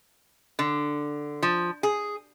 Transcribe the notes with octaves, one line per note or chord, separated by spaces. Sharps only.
D3
F3
G#4